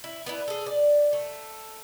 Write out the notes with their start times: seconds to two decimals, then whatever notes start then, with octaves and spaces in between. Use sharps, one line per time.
0.04 E4
0.26 B3 D4 E4
0.48 G#4 A4
0.66 D5
1.13 A3